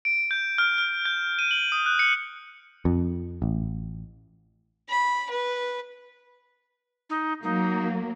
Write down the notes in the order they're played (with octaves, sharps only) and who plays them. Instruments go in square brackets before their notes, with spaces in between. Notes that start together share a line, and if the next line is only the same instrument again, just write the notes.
[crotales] D7
G6
F6
F6
G6
D#7
F#7
D#6
F#6
C#7
[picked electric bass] F2
A1
[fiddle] B5
B4
[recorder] D#4
[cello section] F#3 A#3 [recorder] D#4